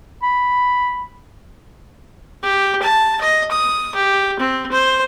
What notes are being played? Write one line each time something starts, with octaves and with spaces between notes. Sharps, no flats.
B5
G4
A5
D#5
D#6
G4
C4
C5